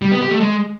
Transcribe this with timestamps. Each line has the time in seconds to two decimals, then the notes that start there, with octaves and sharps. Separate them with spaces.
0.02 G3
0.11 B3
0.21 G4
0.31 A3
0.40 G#3